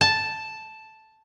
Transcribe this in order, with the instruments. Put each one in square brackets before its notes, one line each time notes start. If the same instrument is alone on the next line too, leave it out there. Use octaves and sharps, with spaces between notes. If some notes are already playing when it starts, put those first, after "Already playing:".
[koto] A5